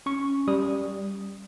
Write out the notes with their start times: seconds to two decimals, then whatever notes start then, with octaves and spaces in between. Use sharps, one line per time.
0.06 C#4 C#6
0.47 G3 D#6